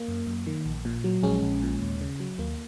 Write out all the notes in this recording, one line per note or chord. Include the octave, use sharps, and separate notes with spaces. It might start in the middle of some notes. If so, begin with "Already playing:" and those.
Already playing: A#3
F#2
F#2
D#3
A#1
A#2
F#3
A#1 G#3 C#4
A#1
A#2
D#2
C#3
F#3
D#2 A#3